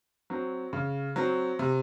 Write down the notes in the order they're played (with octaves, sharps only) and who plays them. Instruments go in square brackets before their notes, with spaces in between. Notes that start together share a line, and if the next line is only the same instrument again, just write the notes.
[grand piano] F#3 C4
C#3
F#3 C4
C3